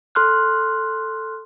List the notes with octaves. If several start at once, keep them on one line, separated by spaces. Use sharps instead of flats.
A4 C6 F6 F#6